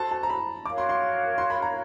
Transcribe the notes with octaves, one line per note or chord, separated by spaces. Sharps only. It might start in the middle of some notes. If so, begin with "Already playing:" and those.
Already playing: F#4 A4 C5 A5
A5
A#5
B5
F#4 A#4 C#5 F5 D6
C6
C6
C6
B5
A#5